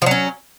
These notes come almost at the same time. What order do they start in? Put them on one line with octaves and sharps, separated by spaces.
F3 F#3 C#4